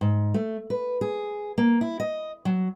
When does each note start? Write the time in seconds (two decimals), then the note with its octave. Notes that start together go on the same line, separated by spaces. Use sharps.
0.01 G#2
0.34 A3
0.70 B4
1.01 G#4
1.58 A#3
1.81 E4
2.00 D#5
2.45 F#3